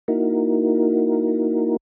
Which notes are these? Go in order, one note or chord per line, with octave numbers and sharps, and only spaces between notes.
A#3 D#4 E4 F#4 A#4